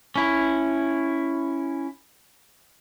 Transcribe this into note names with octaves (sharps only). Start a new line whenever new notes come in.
C#4 E4